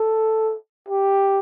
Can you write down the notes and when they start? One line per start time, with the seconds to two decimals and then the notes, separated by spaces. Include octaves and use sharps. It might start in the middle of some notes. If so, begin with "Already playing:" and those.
Already playing: A4
0.88 G4